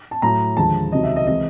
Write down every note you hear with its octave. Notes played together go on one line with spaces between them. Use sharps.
A5
A2 F#3 A#5
D#2 D3 F3 G#3 A5
C#2 C3 D#3 F#3 D#5
E5
D#5
C3 E3 G#3 D#5